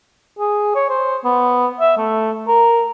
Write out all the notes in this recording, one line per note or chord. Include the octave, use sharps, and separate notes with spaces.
G#4
C#5
C5
B3
E5
A3
A#4